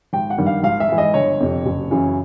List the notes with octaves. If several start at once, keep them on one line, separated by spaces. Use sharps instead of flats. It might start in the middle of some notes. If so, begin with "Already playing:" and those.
G#1 G5
F#5
G2 D#3 G3
F5
G#1 F5
E5
G#2 E3
D#5
G1 C#5
F2 C3
F#1
F#2 C#3 E3